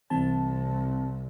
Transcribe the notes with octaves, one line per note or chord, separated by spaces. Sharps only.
C2 E3 C4 A5